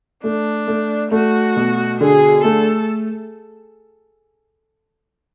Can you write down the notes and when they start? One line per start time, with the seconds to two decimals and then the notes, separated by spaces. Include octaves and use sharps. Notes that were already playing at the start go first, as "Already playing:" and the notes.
0.23 A3 D4
0.68 A3
1.12 A3 F#4
1.57 B2
2.00 D3 G#4
2.44 A3 A4